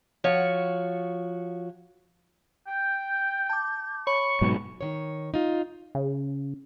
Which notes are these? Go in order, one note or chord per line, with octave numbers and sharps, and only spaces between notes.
F3 F#4 C#5
G5 G6
A5 D6
C#5 B5 C#6 C#7
G#2 B2 F#3
D#3 C#5
D#4 F4
C#3